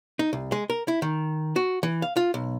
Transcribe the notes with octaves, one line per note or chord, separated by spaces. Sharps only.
D#4
C2
G#3
A#4
E4
D#3
F#4
E3
F5
F4
B1